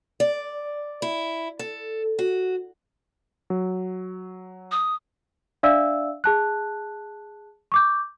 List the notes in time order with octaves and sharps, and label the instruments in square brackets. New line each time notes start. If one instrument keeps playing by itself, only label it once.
[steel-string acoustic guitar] D5
E4
A4
F#4
[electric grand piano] F#3
[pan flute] D#6
[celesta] D4 D5 E5 F5 E6
G#4 A5 F#6
C#6 D6 G6